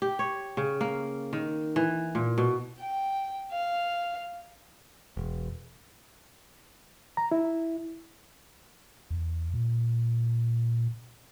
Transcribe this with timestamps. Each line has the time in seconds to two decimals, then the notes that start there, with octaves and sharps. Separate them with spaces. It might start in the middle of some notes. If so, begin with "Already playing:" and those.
0.02 G4
0.19 C#5
0.57 C#3
0.81 A#3
1.33 D#3
1.76 E3
2.15 A#2
2.38 B2
2.79 G5
3.52 F5
5.17 E1
7.17 A#5
7.32 E4
9.10 E2
9.54 A#2